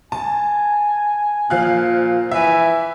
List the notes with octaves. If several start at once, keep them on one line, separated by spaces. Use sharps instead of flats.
G#5 A5
A#2 F3 F5 F#6
E3 E5